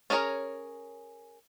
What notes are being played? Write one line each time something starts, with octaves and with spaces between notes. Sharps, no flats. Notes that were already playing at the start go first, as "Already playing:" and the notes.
C#4 D4 G#4 A#4 C#5